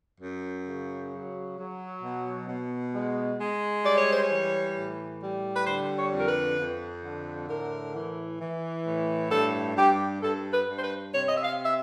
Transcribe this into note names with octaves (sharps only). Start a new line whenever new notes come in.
F#2
C#3
F#3
F#3
B2
B2
G#3
G#3
G3 D5
C#5
C5
C#5
E3
A2
G3
B4
D3 C5
C#5
F2
A#4
B4
F2
D3
A2 A#4
E3
E3
A2
G2 A4
G2 G4
G2 A4
B4
G2
C5
B4
C3 C#5
D#5
E5
F5
E5